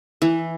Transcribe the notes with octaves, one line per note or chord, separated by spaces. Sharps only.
E3